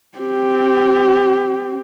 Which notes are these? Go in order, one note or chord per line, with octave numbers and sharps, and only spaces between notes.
C4 G4